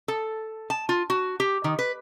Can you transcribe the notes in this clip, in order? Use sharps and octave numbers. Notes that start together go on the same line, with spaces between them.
A4
A5
F4
F#4
G4
D#3
B4